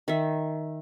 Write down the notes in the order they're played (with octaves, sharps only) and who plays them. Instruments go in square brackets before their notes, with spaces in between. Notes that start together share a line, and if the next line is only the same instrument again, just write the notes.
[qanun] D#3 E5